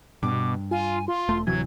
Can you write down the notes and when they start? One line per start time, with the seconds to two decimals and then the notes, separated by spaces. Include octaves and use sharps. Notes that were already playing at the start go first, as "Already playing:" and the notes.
0.23 G2 B2 D6
0.71 F4 G#5
1.08 F4 C6
1.29 E1 A3
1.47 D1 C3 E3 F#3 G#6